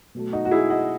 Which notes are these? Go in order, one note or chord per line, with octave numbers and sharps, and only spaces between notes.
B2 F#3 A3
D#4 F#4
F#4
E4 G#4
D#5 F#5